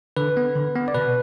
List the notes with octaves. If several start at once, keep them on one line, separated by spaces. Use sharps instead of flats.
D3 B4
B3
D3
B3
D5
B2 B4